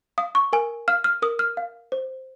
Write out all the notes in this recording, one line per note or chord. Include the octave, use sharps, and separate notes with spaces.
F5 D#6
C#6
A#4 G#5
F5 F6
F6
A#4 D#6
F6
F5
C5